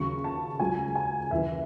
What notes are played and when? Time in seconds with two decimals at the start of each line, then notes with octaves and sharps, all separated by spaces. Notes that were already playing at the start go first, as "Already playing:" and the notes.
Already playing: D#2 C#3 F#3 C#6
0.24 A5
0.60 C#2 C#3 F#3 G#5
0.95 G#5
1.31 D#2 C#3 E3 E5